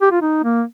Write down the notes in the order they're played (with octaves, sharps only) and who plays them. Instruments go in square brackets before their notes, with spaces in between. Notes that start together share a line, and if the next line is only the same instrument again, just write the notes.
[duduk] G4
F4
D#4
A#3